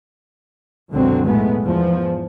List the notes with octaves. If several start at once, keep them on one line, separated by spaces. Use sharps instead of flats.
C#2 F#2 B2 D3 F#3 C4
B1 A2 G#3 A3 B3
E2 G#2 F3